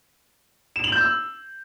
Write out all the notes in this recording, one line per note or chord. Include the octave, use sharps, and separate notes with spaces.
E7
F#7
G6
E6